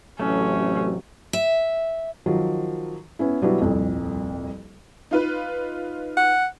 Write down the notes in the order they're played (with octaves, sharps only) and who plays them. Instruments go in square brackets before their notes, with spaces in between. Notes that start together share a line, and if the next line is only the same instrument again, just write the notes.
[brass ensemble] A1 C3 F#3 [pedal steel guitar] A3 [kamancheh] C#4
[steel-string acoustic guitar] E5
[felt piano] D#3 F3 F#3
B3 C#4 E4
B2 F#3 G3 B3 D4 E4
D#1 C2 F2
[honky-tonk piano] D#4 F4 B4
[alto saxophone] F#5